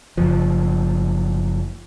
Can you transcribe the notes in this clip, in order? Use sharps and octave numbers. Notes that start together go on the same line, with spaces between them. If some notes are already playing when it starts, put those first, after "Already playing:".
F#1 F3